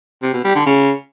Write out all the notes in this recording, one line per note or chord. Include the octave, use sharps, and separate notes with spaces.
C3
B2
G3
D3
C#3